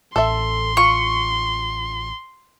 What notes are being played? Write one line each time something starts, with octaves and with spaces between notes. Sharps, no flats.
A1 A4 E5 C6
F4 C#6